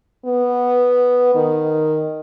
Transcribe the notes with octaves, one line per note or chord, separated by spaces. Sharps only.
B3
D#3